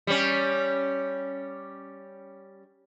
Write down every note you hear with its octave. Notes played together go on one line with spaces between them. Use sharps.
G3 C#4